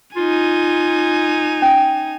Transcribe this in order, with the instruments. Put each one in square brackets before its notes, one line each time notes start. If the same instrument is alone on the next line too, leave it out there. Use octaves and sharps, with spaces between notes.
[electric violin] D#4 G#5 [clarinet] F4
[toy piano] C#4